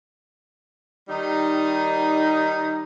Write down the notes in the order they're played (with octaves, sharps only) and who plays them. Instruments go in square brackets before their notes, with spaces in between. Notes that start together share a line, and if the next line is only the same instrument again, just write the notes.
[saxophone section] D#3 G3 D#4